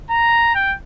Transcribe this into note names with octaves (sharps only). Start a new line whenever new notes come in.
A#5
G5